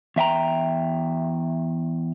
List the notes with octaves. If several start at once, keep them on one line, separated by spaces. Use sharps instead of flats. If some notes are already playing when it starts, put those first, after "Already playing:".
E2 E5 G5 A#5